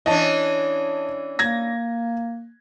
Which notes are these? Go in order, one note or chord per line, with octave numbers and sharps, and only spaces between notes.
E3 C#4 D4 D#5 A5
A#3 G#6 A#6